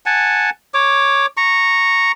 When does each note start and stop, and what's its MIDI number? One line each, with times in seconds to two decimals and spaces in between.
0.06 0.50 78
0.06 0.50 80
0.06 0.50 81
0.74 1.26 73
0.74 1.26 86
1.37 2.12 82
1.37 2.12 85